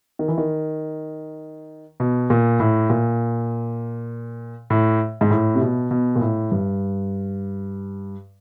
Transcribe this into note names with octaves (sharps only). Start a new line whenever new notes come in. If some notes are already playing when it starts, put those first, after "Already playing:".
D#3
E3
D#3
B2
A#2
A2
A#2
A2
G#2
A2
C3
B2
B2
A#2
A2
G2